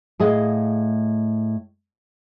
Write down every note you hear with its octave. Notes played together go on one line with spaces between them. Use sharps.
A2 G#4 D#5 F5